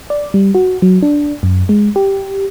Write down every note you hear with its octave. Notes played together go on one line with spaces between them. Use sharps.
D5
G3
F#4
F#3
D4
F#2
G#3
G4